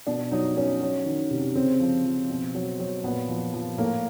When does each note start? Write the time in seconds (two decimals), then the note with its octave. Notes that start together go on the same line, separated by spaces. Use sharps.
0.07 B2 D4
0.32 F#3 D#4
0.56 F#3 C#4
0.81 F#3
1.06 D#3
1.31 C3
1.55 C#3 C4
1.80 F3
2.05 F3
2.30 B2
2.55 F#3
2.79 F#3
3.04 A#2 B3
3.29 F3
3.54 F3
3.78 A2 A#3